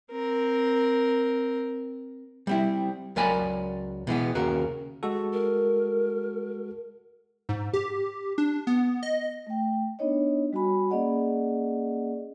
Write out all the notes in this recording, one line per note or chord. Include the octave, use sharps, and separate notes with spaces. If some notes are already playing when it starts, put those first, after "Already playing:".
C4 A#4
G3 C4 E4
C#2 F#3 A#4 D5 G#5 B5
B2 E3 G#3 B3
D#2 C#3 F#4 A#4
G#3 F#4 A4
A#4
G#2
G4
D4
B3
D#5
A3 G5
B3 D4 D#4 C#5 D#5
G3 F#4 G#5 B5
A#3 C#4 G#4 D5 D#5 F#5